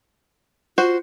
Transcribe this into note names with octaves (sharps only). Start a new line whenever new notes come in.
F4 F#4 C5